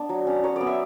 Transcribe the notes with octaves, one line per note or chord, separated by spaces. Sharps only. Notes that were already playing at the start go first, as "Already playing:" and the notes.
Already playing: B3 D4
F#3
C#4
F#3 C#5
B3 D5
E5